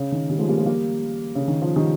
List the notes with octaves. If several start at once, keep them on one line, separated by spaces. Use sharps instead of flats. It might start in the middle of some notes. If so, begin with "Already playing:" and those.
Already playing: C#3
D#3
D#3 G3
F3 G#3
G3 A#3
F3 G#3
G3 A#3
C#3
D#3
F3
D#3 G3